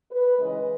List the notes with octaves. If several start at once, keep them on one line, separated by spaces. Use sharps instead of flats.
B4
C#3 E3 G#3 D#5